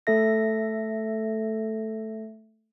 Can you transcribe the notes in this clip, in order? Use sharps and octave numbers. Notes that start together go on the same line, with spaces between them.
A3 A4 E5 A#6